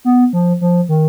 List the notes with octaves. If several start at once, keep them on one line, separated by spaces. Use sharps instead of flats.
B3
F3
F3
D#3